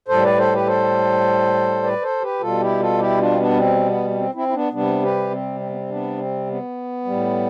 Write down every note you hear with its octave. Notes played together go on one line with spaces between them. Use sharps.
A2 G3 A4 C5
B4 D5
A4 C5
G4 B4
A4 C5
B4 D5
A4 C5
G4 B4
B2 G3 F4 A4
E4 G4
F4 A4
E4 G4
D4 F4
C4
B3 D4
C4
B3
B3
C4
C4 E4
E4
B3 D4
C3 G3 B3 D4
G4 B4
C4
C4
B3
C4
B3 D4
C4
B3
A2 G3